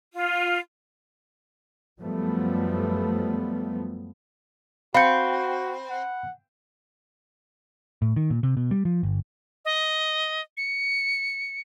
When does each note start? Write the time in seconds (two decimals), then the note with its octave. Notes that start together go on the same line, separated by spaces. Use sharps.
0.13 F4
2.01 F#2 F3 G3 A3 B3
4.95 C4 F#4 F5 B5 G6 C#7
5.90 F#5
8.02 A2
8.16 D#3
8.30 A#2
8.43 C3
8.57 B2
8.71 G3
8.85 F3
9.03 G1
9.65 D#5
10.57 C#7